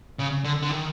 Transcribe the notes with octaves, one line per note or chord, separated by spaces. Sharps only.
C#3
D3
D3
D#3